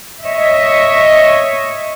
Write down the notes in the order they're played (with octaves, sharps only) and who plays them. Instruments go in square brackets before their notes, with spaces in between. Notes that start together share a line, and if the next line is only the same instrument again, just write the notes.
[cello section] C#5 D#5 E5